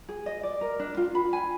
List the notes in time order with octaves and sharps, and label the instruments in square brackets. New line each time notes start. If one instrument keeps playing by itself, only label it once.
[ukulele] G#4
D#5
D5
A#4
D4
F4
B5
G#5